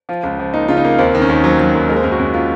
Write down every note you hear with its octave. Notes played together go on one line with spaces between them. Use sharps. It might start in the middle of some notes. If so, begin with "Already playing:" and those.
F3 F4
C#2
F3
A#3 D#4
C#3 F4
D#4
A#3
D#2 C4
D#3
C#4
D#2
F#3 C5
F#3
D#2
G#3 A#4
C5
F#2 A#4
F#4
F#2
F4